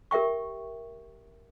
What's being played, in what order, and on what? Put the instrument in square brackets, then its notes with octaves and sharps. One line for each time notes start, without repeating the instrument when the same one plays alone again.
[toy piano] G4 A#4 E5 G5 C#6